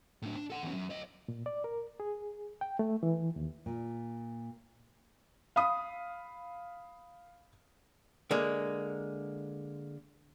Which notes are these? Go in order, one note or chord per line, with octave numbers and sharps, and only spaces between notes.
A2 D4
D4
A4 F#5
E2 C#4
F#2
C#5 D#5
A#2
D5
A#4
G#4
G5
A3
E3
D#2
A#2
F5 B5 D#6
D3 G#3 A#3